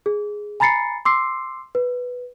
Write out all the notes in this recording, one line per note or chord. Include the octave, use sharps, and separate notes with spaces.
G#4
G#5 A#5 B5 A6 C7 C#7
C6 D6 E6 C7
B4